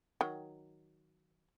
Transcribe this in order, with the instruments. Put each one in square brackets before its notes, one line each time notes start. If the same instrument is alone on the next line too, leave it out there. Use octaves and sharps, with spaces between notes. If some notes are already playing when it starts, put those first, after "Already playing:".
[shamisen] D#3 F#3